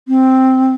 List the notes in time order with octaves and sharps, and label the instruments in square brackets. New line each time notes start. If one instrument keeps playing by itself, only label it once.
[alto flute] C4